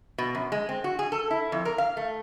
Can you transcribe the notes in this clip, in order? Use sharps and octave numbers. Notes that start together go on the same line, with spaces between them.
B2
F#2
G#3
C4
F#4
G#4
A4
E4
F2
A#4
F5
A3